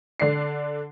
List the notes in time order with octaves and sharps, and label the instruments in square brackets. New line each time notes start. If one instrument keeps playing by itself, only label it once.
[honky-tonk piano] D3 D4 C7